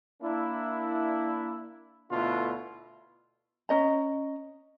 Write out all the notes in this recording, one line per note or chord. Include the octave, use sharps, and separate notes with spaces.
A#3 D4 E4
D2 B2 A3 D4 E4 F4
C#4 D#5 A#5